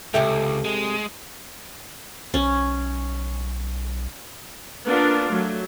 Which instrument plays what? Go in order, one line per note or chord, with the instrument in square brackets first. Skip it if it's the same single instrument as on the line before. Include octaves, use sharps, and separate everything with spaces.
[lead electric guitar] C#2 [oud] C3 G4 A4 [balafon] E5
[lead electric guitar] G#3
[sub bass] B1 [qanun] C#4
[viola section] A#3 B3 D4 F4 A#4
F#3 A3